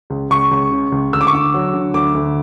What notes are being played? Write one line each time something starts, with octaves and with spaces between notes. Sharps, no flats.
C#2
C#2 C#6
C#2
C#3
C#2
D2 E6
D6
C#6
D3 D6
F#3
D3
D2 D6
D2